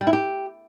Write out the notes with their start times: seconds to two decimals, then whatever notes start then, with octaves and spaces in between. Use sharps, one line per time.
0.01 G3
0.07 E4
0.13 G4